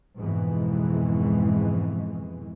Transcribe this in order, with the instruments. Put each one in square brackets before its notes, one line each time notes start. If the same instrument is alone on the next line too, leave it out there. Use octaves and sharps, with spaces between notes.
[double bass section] F2 G#2 B2 E3 G#3